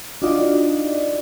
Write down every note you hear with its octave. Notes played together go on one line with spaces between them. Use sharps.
D4 D#4 F4 F#4 D5 D#5